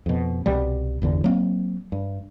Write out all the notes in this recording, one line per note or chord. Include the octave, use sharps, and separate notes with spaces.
F2 B2
C2 B2 G3
G1 E2 D3
F#3 A#3 C4
G2